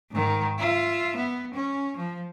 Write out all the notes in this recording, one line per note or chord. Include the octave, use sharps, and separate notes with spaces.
G#2 D#3
F4 E5
B3
C#4
F3